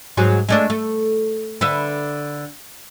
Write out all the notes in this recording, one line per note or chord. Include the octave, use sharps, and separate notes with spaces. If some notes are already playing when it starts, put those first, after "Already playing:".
G#2 F#3 G#4
G#3 A3 D4
A3
D3 B4 E5